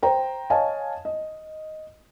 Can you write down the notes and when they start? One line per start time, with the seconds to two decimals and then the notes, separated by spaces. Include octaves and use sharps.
0.03 C5 G5 A#5
0.50 C#5 D#5 F5 G#5 A5
1.05 D#5